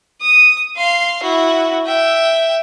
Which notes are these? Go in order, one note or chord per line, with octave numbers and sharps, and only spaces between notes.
D#6
F5 C6
E4 F#4
E5 G5